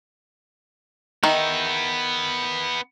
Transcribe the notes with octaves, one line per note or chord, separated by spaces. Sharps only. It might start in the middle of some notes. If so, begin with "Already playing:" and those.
D#3 B3 D#4 E5